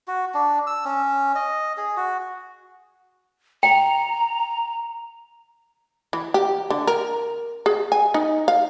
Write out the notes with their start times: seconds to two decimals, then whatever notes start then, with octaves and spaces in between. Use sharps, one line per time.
0.08 F#4
0.34 D4
0.67 E6
0.85 C#4
1.35 D#5
1.77 G#4
1.97 F#4
3.63 G5 A#5
6.13 E3
6.34 G4
6.70 D3
6.87 A#4
7.66 G#4
7.92 G#5
8.14 D#4
8.48 F5